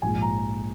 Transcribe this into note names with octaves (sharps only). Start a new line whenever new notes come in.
A#1 G#2 F3 G#5
A#5